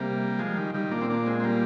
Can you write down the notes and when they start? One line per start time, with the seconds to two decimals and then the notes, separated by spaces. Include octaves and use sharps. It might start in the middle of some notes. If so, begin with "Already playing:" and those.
Already playing: C3 G3 A#3
0.39 F3 G#3
0.57 D#3 G3
0.74 D#3 G3
0.91 A#2 A#3 D4
1.01 C4
1.10 A#3 D4
1.26 G#3 C4
1.40 C4
1.44 G3 A#3